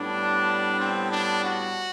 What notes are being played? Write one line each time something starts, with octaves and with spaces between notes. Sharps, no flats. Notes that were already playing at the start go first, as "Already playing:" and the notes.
Already playing: A2 G3 B3 D4
C4
D4
F#4